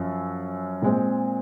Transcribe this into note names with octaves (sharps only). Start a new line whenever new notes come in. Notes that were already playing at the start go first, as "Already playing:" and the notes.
Already playing: F#2 F3 C#4
A#2 G#3 C4